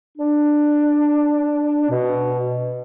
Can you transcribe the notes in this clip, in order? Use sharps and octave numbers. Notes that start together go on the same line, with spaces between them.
D4
B2